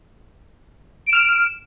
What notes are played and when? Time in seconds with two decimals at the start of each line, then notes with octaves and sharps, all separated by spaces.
1.06 D7
1.10 E7
1.13 F6